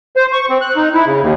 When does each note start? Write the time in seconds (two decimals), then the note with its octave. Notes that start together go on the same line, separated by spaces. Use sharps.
0.16 C5
0.33 C#6
0.50 C4
0.61 F#6
0.76 D#4
0.94 E4
1.07 C#3
1.22 D#2